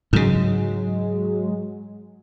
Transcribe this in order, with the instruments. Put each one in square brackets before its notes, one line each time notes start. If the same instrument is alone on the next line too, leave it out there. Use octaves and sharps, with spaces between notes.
[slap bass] G#2 C#3 [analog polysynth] F#3 G#3